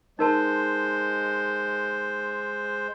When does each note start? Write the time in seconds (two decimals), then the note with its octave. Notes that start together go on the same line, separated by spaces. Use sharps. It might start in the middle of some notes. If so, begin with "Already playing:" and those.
0.19 G#3 D#4 A#4 C5 A5